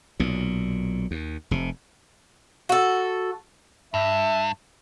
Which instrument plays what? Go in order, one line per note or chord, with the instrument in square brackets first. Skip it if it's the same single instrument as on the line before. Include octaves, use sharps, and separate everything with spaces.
[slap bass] B1 A#2
D#2
F1 C3
[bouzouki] F#4 A4
[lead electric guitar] G2 [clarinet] E5